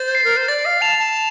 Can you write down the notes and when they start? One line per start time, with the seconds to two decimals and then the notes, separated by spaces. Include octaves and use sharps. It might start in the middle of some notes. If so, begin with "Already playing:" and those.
Already playing: C5 A6
0.15 C7
0.24 A#4
0.37 C5
0.48 D5 A6
0.65 F5
0.81 A5 F7
0.99 A5